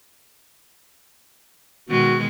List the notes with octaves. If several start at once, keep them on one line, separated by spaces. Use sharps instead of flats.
B2 D#3 G#3 F#4